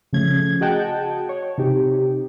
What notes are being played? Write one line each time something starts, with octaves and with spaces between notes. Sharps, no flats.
C#3 F3 A3 C#4 G#6
F#4 G#4 D#5 F#5 G5 A5
C#5
C3 D#4 G4